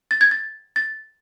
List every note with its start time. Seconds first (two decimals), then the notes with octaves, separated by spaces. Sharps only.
0.11 A6
0.21 G#6
0.31 A6
0.76 A6